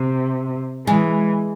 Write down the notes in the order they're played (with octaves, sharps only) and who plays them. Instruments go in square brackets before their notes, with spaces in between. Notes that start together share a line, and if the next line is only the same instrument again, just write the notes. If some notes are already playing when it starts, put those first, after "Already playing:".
Already playing: [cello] C3
[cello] E3 [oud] G#3